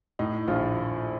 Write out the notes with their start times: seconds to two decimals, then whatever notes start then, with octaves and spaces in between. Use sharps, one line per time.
0.19 A2 D#4
0.48 A#1 F4